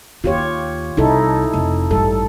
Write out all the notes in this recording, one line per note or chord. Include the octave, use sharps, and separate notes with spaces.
D#2 D#3 F4 G4 C#5
C2 D#4 E4 A4
F1
A1 G2 G3 A4